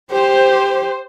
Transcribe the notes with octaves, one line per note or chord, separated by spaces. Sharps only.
G4 C5